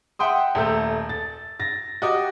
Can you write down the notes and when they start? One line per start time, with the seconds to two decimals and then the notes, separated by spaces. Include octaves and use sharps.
0.19 E5 F#5 G5 C6 D#6
0.55 D#1 A3 E6 G6
1.09 A6
1.60 A6 A#6
2.02 F#4 G4 D#5 D6